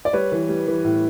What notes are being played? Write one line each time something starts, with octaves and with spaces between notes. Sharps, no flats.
D5
G3 B4 C#5
E3
G3
E3
A2